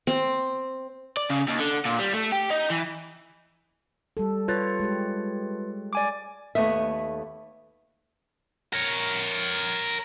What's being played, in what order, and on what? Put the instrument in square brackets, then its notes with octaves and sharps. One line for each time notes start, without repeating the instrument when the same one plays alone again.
[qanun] C4
[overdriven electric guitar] D5
C#3
D#2
D3
A#2
G3
A3
G4
D#4
E3
[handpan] G3 A4
[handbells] F4 B4 A6 [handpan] C#5
[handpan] G#3 G4
[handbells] D5 G#5 D6
[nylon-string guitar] D#2 A3 B3 D#5 E5
[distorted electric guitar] A#4 C#5